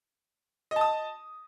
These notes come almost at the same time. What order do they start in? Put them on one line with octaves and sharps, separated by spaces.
D#5 A5 D#6